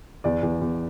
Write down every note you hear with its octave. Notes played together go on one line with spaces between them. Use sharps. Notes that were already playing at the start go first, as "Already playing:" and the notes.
E2 D5
E2
E2